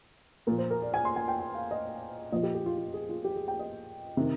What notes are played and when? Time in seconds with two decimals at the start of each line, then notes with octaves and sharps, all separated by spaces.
0.47 A#2 F3 A#4
0.58 C5
0.71 A#4
0.82 D5
0.94 G#5
1.05 C6
1.16 G#5
1.28 G5
1.39 G5
1.55 F5
1.71 D#5
2.32 A#2 F3 D#5
2.43 G4
2.55 G4
2.66 F4
2.78 F4
2.94 G#4
3.09 F4
3.24 G4
3.36 G#4
3.48 G5
3.59 D#5
4.17 C3 D#3